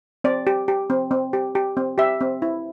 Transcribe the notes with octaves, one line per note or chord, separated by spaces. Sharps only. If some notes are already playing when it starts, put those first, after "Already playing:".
C4 D5
G4
G4
C4
C4
G4
G4
C4
G4 E5
C4
E4